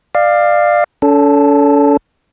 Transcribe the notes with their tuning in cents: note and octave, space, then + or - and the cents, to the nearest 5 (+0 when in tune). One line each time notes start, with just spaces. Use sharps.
D5 +25 F5 +0
C#4 +45 A4 +0